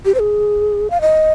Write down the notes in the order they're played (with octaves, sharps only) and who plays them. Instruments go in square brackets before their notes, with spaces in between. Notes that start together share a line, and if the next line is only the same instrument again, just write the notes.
[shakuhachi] G4
C5
G#4
F5
D#5